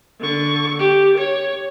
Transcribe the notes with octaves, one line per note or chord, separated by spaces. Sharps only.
D3 C#6
G4
C#5